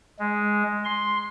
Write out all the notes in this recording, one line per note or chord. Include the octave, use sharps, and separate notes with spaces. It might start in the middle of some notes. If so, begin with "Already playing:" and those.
G#3
C6